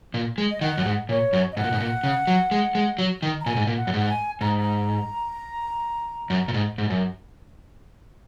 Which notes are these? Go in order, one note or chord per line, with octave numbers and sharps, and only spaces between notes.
A#2
G#3
D#5
D#3 F#5
F#2
G#2
A#2 C#5
F#2
D#5
G#2 F#5
A#2
G#2
A#2
C#3
F#3
G#3
G#3
F#3
D#3
A#5
A#2 G#5
G#2
A#2
F#5
F#2
G#2
F#5
G#5
G#2 A#5
A#5
F#2
A#2
G#2
G#2
F#2